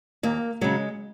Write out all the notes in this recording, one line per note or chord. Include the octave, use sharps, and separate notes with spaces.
D#2 A#3
C#3 F#3 G#3